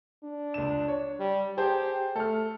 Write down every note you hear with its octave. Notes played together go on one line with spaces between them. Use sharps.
D4
C#2 E7
C#5
G3
G4 G#4 C5 A5
A3 A4 F6